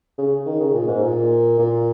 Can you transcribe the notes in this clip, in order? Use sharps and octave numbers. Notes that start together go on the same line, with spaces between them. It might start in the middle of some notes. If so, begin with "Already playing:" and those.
C#3
D#3
C#3
A#2
G#2
A#2
A#2